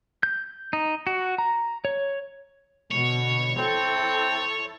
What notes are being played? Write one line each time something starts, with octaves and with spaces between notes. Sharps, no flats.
G6
D#4
F#4
A#5
C#5
B2 D3 C#5
C4 E4 A4